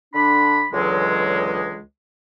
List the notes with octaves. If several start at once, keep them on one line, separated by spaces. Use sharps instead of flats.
D3 D4 B5
C#2 D3 E3 F#3 G#3